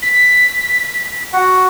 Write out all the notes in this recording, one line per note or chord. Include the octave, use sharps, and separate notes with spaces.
B6
F#4 F#5